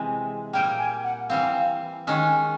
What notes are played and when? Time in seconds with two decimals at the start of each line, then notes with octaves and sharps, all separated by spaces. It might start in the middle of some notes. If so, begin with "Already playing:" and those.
Already playing: C3 E3 G#3
0.53 A#2 G3 A#3 G5
0.79 G#5
1.04 F#5
1.30 E3 G3 C4 F5
2.07 D#3 G#3 C#4